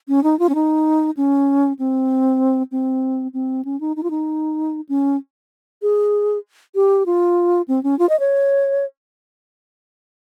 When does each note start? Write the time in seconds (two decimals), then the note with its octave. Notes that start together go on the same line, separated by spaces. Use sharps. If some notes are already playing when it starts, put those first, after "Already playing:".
0.08 C#4
0.23 D#4
0.39 F4
0.49 C#4
0.55 D#4
1.17 C#4
1.79 C4
2.72 C4
3.34 C4
3.65 C#4
3.81 D#4
3.96 D#4
4.03 F4
4.10 D#4
4.89 C#4
5.82 G#4
6.75 G4
7.06 F4
7.68 C4
7.83 C#4
7.99 F4
8.09 D#5
8.20 C#5